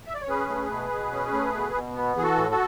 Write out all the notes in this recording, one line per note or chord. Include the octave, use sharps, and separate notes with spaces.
E5
D5
C#5
C#4 G#4 B4
A3
B2
B2
C#4
A3
B2
B2
B3
E3 G#4
F#4 A4
A2
F#4 A4